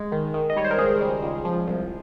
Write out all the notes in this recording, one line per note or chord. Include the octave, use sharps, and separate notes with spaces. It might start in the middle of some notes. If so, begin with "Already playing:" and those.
Already playing: G#3
D#3
D#3
D#5
G3 C#5
C5
A#4
C#2 G#4
G3
C#2
F3
C2